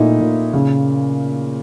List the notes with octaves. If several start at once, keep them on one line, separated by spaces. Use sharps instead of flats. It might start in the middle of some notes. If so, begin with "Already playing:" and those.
Already playing: A#2 A3 D#4 E4
A#2
C#3